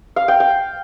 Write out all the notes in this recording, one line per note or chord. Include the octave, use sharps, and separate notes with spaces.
F5
G5
G5